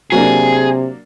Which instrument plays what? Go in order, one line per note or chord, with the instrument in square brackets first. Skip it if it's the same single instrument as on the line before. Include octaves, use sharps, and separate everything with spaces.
[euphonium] C3 [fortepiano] F#3 A#3 D4 [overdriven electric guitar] G#4